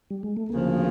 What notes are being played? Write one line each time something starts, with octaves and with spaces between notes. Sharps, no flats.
G3
G#3
A3
D2 C#3 F3 A#3